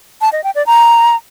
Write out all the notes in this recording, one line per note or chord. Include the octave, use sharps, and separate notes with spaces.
A5
D#5
G5
D5
A#5